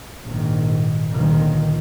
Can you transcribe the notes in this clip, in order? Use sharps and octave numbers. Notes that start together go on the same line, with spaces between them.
A#1 G#2 D#3
C#2 A#2 D3 D#3 F3